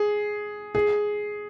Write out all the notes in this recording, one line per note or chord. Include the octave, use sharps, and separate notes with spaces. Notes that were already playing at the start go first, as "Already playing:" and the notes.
Already playing: G#4
G#4